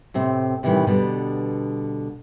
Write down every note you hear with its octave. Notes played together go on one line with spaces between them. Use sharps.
A2 C3 C4
A2 C3 D#3 E3 G3
B2 D3 G3 B3